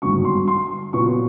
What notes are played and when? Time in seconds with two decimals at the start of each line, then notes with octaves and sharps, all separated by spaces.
0.02 G#1 G2 D3 F#3 B3 C#6
0.25 C6
0.48 C6
0.93 A#2 F#3 B3 C#6